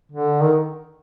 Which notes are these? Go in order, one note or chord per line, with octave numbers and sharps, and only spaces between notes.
D3
D#3